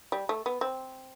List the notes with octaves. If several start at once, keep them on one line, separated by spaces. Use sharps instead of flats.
G3
A3
B3
C4